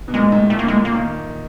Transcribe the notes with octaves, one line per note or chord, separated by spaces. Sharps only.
B2
A#2 G#3
A2
A#2 A3
A#3
A#2
A2 G#3
A#2 A#3
D#3